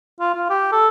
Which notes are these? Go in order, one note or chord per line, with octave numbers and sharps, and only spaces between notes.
F4
F4
G4
A4